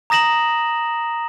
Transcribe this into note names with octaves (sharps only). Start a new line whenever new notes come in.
A#5 D#6 A#6 E7 F#7